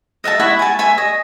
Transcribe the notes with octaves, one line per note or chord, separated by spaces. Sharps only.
D#5 E5 F#5 A5
E4 E5 F#5 C#6
G#5 A5
E5 G#5 C#6
D#5